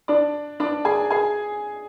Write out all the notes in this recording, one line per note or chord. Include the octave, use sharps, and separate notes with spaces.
D4 D5
D4 D5
G#4 G#5
G#4 G#5